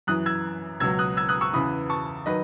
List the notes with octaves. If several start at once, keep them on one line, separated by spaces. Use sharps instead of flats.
F#2 E3 D#6 F#6
E6 G#6
C#2 B2 F#3 E6 G#6
D#6 F#6
E6 G#6
D#6 F#6
C#6 E6
E2 C#3 E3 B5 D#6
A5 C#6
D#3 F#3 B4 D#5